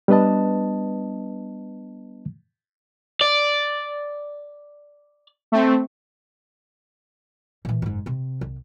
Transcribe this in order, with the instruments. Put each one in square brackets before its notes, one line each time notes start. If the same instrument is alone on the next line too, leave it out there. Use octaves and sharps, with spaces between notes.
[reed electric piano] G3 B3 D4 B4 D#5 A5
[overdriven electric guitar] D5
[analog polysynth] A3 C4
[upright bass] A#2 E3
F#1 G#2
C3 C4
C2